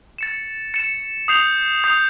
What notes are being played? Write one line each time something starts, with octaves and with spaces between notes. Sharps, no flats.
A6 C#7 E7
A6 C#7 E7
D#6 G6 C7 F7
D#6 G6 C7 F7